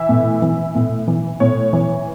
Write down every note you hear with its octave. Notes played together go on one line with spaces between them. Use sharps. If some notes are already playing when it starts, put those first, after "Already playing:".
Already playing: E3 E5
A2
E3
A2
E3
A2 C#5
E3